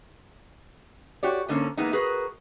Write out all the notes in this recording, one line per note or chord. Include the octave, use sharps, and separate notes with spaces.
F#4 G4 C#5 D5
G#2 D3 A#3 C#4
E3 G#3 A#3 B3 D#4
F#4 G#4 A#4 B4